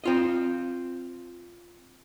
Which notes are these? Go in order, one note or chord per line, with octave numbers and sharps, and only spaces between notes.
C4 F4 D#5